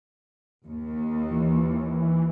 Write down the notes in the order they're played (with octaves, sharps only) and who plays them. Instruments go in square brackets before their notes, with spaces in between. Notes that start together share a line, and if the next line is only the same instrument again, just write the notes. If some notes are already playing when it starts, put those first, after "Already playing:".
[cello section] D#2
[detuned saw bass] E3